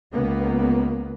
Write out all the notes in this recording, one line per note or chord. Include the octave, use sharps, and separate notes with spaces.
C#2 A#3 B3